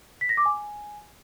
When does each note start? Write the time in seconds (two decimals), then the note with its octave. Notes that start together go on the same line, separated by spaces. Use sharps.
0.21 B6
0.29 A#6
0.37 D6
0.46 G#5